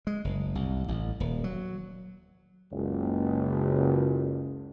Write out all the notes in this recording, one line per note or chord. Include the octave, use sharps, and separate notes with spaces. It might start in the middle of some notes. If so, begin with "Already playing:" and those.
G#3
F#1
C2
A1
D#1
F#3
F#1 C#2